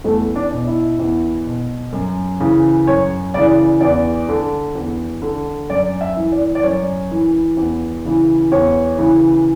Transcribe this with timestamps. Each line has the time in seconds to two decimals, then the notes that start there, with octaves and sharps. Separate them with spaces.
0.04 E2 A3
0.36 D4
0.52 B2
0.67 E4
0.99 E2
1.46 B2
1.93 F#2
2.40 C#3 E3
2.87 F#2 C#5
3.34 C#3 E3 D5
3.81 E2 D5
4.29 D3
4.75 E2
5.22 D3
5.69 F#2 D5
6.01 E5
6.16 E3
6.32 D5
6.55 D5
6.63 F#2 C#5
7.11 E3
7.57 E2
8.05 C#3 E3
8.52 E2 C#5
8.98 C#3 E3